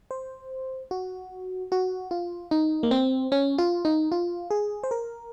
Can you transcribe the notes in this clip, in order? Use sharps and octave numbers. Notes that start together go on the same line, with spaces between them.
C5
F#4
F#4
F4
D#4
A#3
C4
C#4
F4
D#4
F4
G#4
C5
A#4